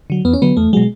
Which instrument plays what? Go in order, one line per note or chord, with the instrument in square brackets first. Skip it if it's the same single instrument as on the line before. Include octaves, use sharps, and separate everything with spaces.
[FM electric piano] D3 F#3
E2 B3
C#4
D3 F#3 B3
E2 A3
B2 F#3 G#3